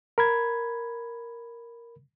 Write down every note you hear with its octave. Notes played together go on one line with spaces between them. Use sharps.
A#4 B5 G#6